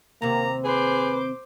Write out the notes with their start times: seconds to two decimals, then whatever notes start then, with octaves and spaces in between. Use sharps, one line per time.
0.22 D#2 C3 A#3 A#5
0.65 G#4 B4 C5 D6